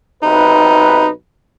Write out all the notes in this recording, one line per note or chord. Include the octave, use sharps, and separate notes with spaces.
B1 C3 D#4 B4